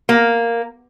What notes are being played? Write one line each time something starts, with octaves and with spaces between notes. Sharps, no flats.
A#3